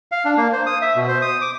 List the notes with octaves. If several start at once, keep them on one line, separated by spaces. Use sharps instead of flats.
F5
D4
A#3
C5
D#6
E5
B2
C5
D#6
D6